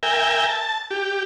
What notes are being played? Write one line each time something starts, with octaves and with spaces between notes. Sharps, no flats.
A#4 E5 G5 G#5
A5
G4